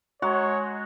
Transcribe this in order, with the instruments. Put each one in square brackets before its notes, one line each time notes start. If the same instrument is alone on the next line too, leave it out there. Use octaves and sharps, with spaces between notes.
[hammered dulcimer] G#3 F#4 A#5 [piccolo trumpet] C#5